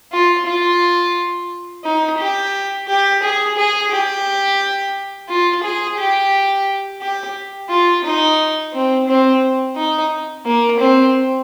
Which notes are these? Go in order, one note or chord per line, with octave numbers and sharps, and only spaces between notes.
F4
F4
D#4
G4
G4
G#4
G#4
G4
F4
G#4
G4
G4
F4
D#4
C4
C4
D#4
A#3
C4